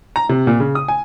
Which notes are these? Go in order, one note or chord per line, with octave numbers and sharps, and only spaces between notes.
A#5
C3
A#2
C#3
D#6
G#5